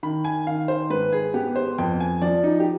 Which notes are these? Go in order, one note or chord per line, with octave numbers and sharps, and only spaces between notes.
D#3 B5
G#5
D#3 F5
C5
G#2 B4
G#4
B3 G4
C5
F2 G5
G#5
F3 D5
D#4
G4